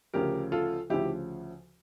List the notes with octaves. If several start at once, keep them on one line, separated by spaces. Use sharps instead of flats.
D2 C#3 F3 G4 A#4
F4 A4
D2 C#3 F3 E4 G4